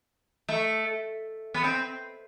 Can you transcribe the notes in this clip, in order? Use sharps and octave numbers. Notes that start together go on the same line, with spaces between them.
A3
B3
C4